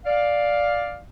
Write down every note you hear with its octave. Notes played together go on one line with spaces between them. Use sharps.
D5 F5